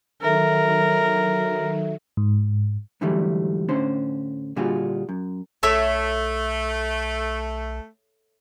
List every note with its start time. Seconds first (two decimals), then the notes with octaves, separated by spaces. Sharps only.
0.23 D#3 F#3 A4 A#4 E5
2.17 G#2
3.01 G#2 D3 E3 F#3 G3 A3
3.69 A2 D3 C#4 C5
4.56 A#2 D3 G3 F4 F#4 G#4
5.09 F#2
5.63 B1 A3 A4 C#5 E5